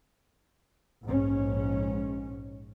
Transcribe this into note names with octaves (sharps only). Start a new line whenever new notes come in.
A#1 G#2 C#4